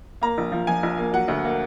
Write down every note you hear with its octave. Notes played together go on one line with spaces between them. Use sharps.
A#3 A#5
A#1
F3
F3 G#5
A#1
A#3
F#3 F#5
D2
A#3